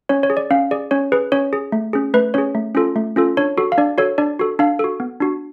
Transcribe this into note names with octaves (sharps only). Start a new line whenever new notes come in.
C#4 C#5
C#5
G#4
D5
C#4 F5
G#4 D5
C#4 C#5
G#4 B4
C#4 C#5
G#4
A3
C#4 G#4
A3 B4
C#4 G#4 C#5
A3
C#4 F4 A4
A3
C#4 F4 A4
D4 C#5
F#4 A4
F5
D4 D5
F#4 A4 C#5
D4 D5
F#4 A4
D4 F5
F#4 A4
B3
D4 F#4